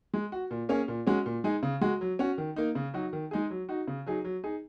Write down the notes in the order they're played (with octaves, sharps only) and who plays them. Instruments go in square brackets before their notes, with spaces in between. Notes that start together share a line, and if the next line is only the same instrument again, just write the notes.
[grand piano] G#3
F#4
A#2
A#3 C#4 G#4
A#2
G#3 C#4 F#4
A#2
G#3 D#4 G#4
C#3
G#3 F#4
F#3
C#4 F#4
D#3
A#3 D#4
C#3
F#3 D#4 F#4
D#3
G#3 D#4 G#4
F#3
D#4 F#4
C#3
F#3 D#4 G#4
F#3
D#4 G#4